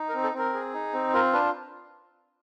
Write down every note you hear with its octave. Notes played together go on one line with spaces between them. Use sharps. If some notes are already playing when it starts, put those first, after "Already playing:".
Already playing: D#4
A#4
C4
A4
C4 A#4
G#4
D#4
C4
F4 A#4
D4 B4